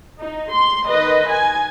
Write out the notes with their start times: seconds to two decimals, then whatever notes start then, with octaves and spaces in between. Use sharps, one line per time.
0.20 D#4
0.52 C6
0.88 D#3 B4 D#5
1.30 G#5